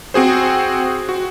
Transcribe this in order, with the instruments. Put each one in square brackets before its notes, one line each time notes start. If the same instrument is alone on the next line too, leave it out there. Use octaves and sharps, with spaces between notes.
[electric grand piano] C4 F#4 G#4 C5
F#4